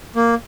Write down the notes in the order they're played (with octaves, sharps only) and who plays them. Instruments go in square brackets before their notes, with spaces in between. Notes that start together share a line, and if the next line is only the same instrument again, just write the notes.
[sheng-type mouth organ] A#3